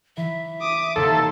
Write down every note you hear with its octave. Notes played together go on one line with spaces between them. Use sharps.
E3 E5
D6 D#6
D#2 C3 A4 C6